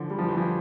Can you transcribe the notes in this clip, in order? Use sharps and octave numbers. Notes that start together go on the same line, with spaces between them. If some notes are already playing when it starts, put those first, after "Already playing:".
Already playing: D3 E3 F3
G3
F3
E3
F3